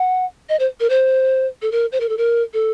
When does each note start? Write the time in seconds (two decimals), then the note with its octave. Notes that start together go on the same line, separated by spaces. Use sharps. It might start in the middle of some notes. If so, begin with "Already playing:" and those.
Already playing: F#5
0.49 D#5
0.59 C5
0.80 A#4
0.90 C5
1.62 A4
1.72 A#4
1.92 C5
2.00 A#4
2.09 A4
2.17 A#4
2.53 A4